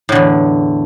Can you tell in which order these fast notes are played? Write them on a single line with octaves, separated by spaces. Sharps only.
A2 D3 E2